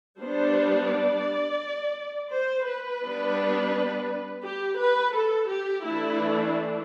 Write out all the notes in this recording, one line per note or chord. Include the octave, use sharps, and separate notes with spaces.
G3 B3 D4 C5
D5
C5
B4
G3 B3 D4
G4
B4
A4
G4
E3 A3 D4 E4